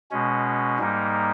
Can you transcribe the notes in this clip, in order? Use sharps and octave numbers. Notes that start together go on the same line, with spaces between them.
B2 G#3 C#4
G#2 G3 A#3 D#4